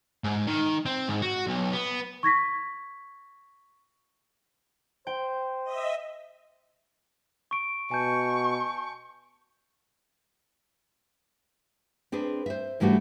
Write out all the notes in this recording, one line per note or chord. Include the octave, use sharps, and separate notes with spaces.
G#2
D#3
C4
G#2
F#4
B1
B3
C#6 G#6 A#6 B6
C5 G5
D#5 E5
C#6 D7
B2 G#5 A5 C#6 G6
C4 D4 G#4 B4
C5 E5
G#2 E3 G3 A3 D4 F#4